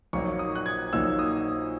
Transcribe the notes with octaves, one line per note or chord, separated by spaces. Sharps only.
A#1 A#2 F#3 A#3 D#4 C#6
D#6
F#6
G#6
A#1 A#2 F#3 A#3 D#4 E6
D#6